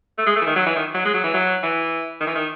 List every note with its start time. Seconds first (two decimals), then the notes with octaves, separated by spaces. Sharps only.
0.18 A3
0.26 G#3
0.36 A3
0.42 E3
0.46 D#3
0.56 F#3
0.66 E3
0.76 D#3
0.94 F#3
1.05 G#3
1.14 F#3
1.24 E3
1.34 F#3
1.63 E3
2.21 D#3
2.27 E3
2.35 D#3